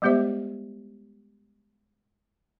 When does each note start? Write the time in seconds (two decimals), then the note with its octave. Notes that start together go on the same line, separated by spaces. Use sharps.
0.02 G3 G#3 B3 G4 C5 E5